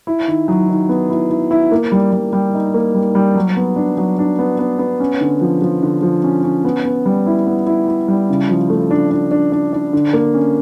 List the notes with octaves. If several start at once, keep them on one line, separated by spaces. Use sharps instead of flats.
E4
D#3
F#3
D#3
B3
E4
E4
E4
A#3
G3
G3
G3
D#4
A#3
G3
G3
F#3
B3
D4
F#3
D4
B3
B3
B3
C#4
D3
F3
F3
D3
F3
C#4
C#4
B3
B3
G3
E4
B3
E4
E4
G3
C#3
F3
A3
D4
D4
D4
D4
D4
D3
A#3
C#4